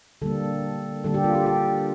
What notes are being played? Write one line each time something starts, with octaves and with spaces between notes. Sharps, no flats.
D3 G3 A#3 A4
D3 G3 A#3 A4
G4
F4
G4
G4